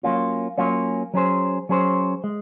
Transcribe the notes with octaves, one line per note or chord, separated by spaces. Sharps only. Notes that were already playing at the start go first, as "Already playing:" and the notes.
F#3 A#3 C#4 F4
F#3 A#3 C#4 F4
F#3 C#4 G#4 C5
F#3 C#4 G#4 C5
G#3